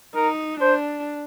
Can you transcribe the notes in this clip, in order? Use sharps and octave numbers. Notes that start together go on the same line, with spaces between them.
D#4 A#4
D4 C5